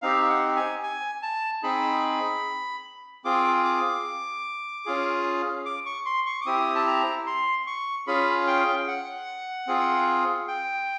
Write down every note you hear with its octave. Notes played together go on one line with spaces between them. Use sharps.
C4 D#4 G4 F5
F#5
G#5
G#5
A5
C4 D#4 G#4 B5
C4 F4 G#4 D6
D6
C#4 F4 G#4
D6
C#6
C6
C#6
D6
C4 E4 G4 D#6
A5
A#5
C6
C#6
C#4 F4 G#4 B5
G5
F#5
C4 F4 G#4
G5